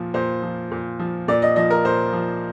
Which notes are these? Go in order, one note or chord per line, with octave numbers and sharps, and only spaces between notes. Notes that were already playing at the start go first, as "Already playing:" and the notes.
Already playing: A#2 F3
A#2 C5
F3
A#2
F3
A#2 D5
D#5
F3 D#5
A#4
A#2 C5
F3